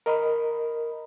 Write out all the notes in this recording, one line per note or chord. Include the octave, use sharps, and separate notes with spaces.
A#4 D#5 A#5 B5